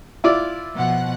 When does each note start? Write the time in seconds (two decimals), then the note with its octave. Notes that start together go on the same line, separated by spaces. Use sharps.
0.24 E4 F4 D5
0.74 B2 F3 F#5